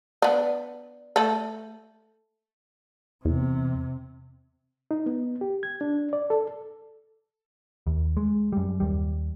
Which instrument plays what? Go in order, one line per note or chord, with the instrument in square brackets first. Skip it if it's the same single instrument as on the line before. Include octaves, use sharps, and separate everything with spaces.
[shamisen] B3 D4
A3 A4
[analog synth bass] E2 [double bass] C3
[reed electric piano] D#4
B3
G4
G#6
D4
D5
A4
[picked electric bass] D#2
G#3
F#2 G3
D#2 G3